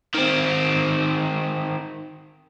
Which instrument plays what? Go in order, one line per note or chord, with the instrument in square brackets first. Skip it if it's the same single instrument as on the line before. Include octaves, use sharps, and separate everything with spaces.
[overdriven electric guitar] D#3 C4